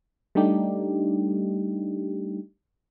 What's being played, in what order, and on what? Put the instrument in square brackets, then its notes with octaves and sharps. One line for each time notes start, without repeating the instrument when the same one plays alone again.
[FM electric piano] G3 A3 D4 D#4 G4